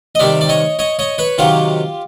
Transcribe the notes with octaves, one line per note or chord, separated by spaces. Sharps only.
D#5
C3 D#3 G3 D5 E5
D5
C#5 D#5
C#5 D#5
C#5 D#5
B4 C#5
C3 D#3 F#3 F4 G4